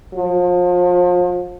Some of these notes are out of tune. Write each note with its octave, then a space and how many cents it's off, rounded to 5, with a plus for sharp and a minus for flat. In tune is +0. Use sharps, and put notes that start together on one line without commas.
F3 +35